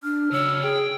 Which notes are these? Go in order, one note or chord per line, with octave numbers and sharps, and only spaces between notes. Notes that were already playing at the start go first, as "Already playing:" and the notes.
D4 F6
C#3 F#4 C#5 E6
G#4 G5